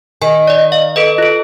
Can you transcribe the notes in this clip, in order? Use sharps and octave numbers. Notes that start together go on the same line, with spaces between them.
D#3 G#5
D5 D#5
F5
A4 B4 D#5
F4 A4